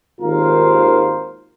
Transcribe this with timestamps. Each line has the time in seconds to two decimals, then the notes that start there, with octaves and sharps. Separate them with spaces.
0.21 G#1 D#2 F4 A#4 C5 F5